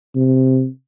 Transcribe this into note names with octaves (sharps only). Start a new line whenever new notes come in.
C3